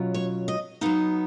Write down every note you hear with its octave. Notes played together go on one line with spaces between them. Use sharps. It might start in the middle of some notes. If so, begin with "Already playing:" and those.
Already playing: B2 F#3 C#4 F4
C#5
D#5
F#3 B3 D#4 F5